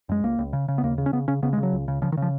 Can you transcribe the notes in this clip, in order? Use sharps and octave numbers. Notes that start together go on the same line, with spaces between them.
F#2 G#3
C#2 A#3
C#2
C#3
C#3
B3
D#2 A#3
C#3
C#4
C#3 B3
C#3 C#4
C#3 B3
G#3
C#3
F#3
C#2
C#3
C#3 F3
D#3
C#3 F3